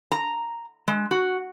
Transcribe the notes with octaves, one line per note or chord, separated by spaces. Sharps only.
A#5
G#3
F#4